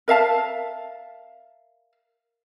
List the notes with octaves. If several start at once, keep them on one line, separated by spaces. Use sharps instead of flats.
A#4 E5 F5 A5